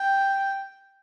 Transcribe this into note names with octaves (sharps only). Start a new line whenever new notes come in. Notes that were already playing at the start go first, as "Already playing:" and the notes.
Already playing: G5